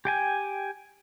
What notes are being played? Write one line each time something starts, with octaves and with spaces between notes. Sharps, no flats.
G4 G5 G#5